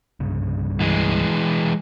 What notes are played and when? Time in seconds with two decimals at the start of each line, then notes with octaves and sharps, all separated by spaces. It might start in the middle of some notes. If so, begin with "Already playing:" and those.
0.20 C2 G2 C#3
0.80 E3 G#3